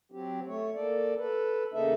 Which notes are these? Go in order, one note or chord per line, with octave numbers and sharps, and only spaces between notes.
F#3 C4 G4
A3 C#5
A#3 A4 D5
A4 B4
E2 C#3 A#3 D#4 A4 E5